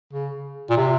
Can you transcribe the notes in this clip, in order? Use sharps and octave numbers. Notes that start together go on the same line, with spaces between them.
C#3
A#2
C3